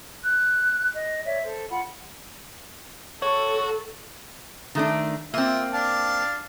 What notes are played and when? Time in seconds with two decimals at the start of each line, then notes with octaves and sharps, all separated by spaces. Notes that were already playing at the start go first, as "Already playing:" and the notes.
0.23 F#6
0.93 D#5
1.25 C#5 D5 E5
1.43 A4 C5
1.70 F4 F#5 B5
3.22 F#4 A4 C#5 C#6
4.75 D#3 A3 D4
5.34 A#3 C4 F4 E5
5.73 D4 F5 A5